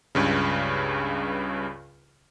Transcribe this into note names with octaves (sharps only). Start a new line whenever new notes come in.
C#2 G2 C#3